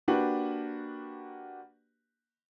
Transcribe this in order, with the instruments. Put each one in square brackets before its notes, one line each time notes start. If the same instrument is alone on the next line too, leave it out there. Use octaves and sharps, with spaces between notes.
[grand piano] A#3 D4 F#4 G4 B4